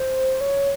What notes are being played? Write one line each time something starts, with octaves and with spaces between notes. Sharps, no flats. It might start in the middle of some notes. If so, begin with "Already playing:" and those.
Already playing: C5
C#5